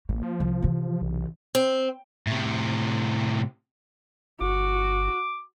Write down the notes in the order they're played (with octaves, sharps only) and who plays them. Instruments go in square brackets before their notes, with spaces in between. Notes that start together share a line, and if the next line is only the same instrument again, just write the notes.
[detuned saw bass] A1 [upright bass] A#3
[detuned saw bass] F3
[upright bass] C2
C3 E3
[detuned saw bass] B1
[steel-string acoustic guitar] C4
[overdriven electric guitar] A2 C3
[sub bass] G1 [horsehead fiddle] F#4 [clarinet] D6